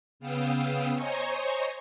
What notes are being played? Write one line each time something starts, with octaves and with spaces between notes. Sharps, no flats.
C#3 B3 F5 G5 D#6 E6
C5 C#5 D#5 G#5 A#5 C#6